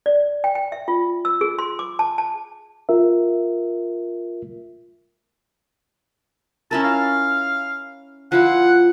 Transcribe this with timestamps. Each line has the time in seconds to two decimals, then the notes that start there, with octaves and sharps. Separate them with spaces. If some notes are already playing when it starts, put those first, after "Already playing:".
0.06 D5
0.44 G5
0.55 G5
0.72 E5
0.88 F4
1.25 E6
1.41 G#4
1.59 C6
1.79 D6
1.99 A5
2.18 A5
2.89 F4 A#4 E5
6.71 C#4 E4 A#4 A5
6.84 F5
8.32 F3 E4 F4 F#5